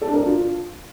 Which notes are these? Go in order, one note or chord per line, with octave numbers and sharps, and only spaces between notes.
A4
D4
A#4
D4
F4